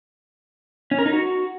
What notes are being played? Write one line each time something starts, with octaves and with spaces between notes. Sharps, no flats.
C#4
A#4
D#4
F#4